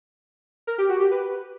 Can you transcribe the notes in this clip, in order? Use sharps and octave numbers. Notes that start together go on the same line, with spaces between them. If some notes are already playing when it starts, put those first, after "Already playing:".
A#4
G4
F#4
G4
B4